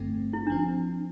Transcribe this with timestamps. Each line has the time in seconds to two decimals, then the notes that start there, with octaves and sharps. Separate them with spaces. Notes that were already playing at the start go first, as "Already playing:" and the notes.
Already playing: G1 G2 D3 A3 C4
0.33 E4
0.47 D4
0.50 F3 C4